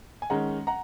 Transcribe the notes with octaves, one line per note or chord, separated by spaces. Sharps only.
G#5
D#3 G#3 C#4 F#5 A#5
F#5 A#5